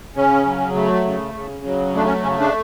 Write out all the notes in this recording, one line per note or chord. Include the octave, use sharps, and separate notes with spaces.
C#3 C#4
F#3
A3
C#3
C#3
F#3
A3 D4
C#4
C#3 C#4
D4